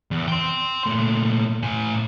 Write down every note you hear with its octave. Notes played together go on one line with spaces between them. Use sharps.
E2
G5 C6
A#2 A3
A2 G#5